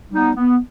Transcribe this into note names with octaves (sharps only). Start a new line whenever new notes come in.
G3 B3 D#4
B3